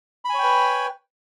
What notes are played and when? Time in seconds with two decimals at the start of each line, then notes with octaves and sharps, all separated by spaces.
0.25 B5
0.29 G#5
0.34 C#5
0.39 G5
0.43 B4